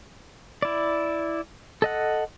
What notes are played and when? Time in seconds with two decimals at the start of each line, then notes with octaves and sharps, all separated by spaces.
0.62 E4 D5
1.82 A4 D#5 F#5